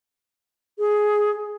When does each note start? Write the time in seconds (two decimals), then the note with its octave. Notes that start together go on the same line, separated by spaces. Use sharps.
0.78 G#4